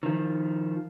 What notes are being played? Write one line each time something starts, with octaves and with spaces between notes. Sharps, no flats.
D#3 F3